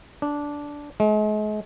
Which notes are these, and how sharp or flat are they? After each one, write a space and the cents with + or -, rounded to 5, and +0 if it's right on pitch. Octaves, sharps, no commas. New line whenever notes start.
D4 -10
G#3 +40